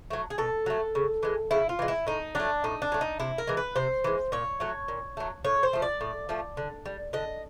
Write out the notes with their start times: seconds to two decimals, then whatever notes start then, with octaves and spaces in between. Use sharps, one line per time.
0.10 F#3 A3
0.30 G#4
0.38 B2 A4
0.66 F#3 A3
0.95 C#3
1.23 E3 G#3
1.51 C#3 E4
1.69 F4
1.79 E3 G#3
1.88 E4
2.07 A2 D#4
2.35 F#3 A3 D4
2.64 A2 D#4
2.82 D4
2.92 F#3 A3
3.01 D#4
3.20 C3 E4
3.38 A#4
3.47 E3 G#3
3.57 B4
3.76 C3 C5
4.04 E3 G#3
4.32 A#2 C#5
4.60 F#3 A3
4.88 A#2
5.17 F#3 A3
5.44 A2 C#5
5.63 C5
5.73 F3 A3
5.82 D5
6.01 A2
6.29 F3 A3
6.57 D3
6.86 G3
7.13 D3 D#5